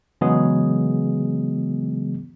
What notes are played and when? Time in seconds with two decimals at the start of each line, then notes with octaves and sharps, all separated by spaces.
0.21 C#3 E3 F#3 G#3 B3 G#4